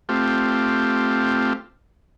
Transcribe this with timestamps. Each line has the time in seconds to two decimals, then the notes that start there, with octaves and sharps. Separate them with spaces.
0.09 A3 C4 F4 G4